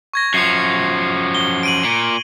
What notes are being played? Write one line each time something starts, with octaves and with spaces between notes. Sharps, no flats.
C#6 G#6 A#6
F#2 F3 C7 C#7
G7
D7 D#7 F#7
A#2